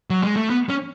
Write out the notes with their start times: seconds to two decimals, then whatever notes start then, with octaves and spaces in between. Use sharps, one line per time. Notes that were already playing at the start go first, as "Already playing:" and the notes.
0.10 F#3
0.23 G#3
0.37 A3
0.50 B3
0.69 C#4